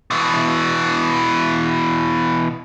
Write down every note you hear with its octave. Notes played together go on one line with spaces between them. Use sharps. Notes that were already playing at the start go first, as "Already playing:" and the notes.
B2 E3